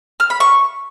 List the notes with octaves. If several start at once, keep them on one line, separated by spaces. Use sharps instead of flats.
F6
B5
C#6